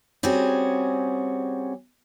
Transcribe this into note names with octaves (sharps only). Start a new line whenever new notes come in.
G3 C4 C#4 F#4 G#4